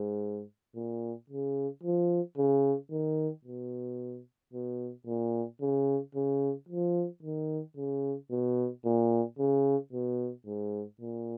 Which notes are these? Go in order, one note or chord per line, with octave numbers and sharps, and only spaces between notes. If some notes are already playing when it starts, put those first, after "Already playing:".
Already playing: G#2
A#2
C#3
F3
C#3
D#3
B2
B2
A#2
C#3
C#3
F3
D#3
C#3
B2
A#2
C#3
B2
G#2
A#2